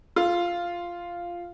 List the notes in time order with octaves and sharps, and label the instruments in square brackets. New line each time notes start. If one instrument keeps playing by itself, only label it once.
[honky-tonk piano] F4